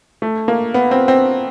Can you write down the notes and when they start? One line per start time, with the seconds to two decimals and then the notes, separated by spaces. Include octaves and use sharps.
0.22 A3
0.48 A#3
0.74 B3
0.91 C4
1.08 C4